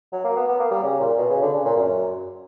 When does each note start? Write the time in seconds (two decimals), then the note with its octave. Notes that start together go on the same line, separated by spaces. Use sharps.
0.13 F#3
0.24 A#3
0.36 B3
0.48 B3
0.60 A#3
0.71 G3
0.83 C#3
1.00 A#2
1.18 B2
1.30 C#3
1.42 D3
1.54 C#3
1.65 A#2
1.76 F#2